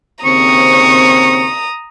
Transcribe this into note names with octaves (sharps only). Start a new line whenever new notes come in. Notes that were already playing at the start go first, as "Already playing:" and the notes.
D#2 C#3 C4 A#5 C#6 D#6